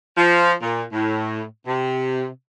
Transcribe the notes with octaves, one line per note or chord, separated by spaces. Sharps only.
F3
A#2
A2
C3